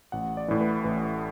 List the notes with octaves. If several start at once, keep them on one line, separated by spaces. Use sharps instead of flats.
A1 F#5
D5
A2 E3
B4
A1 B4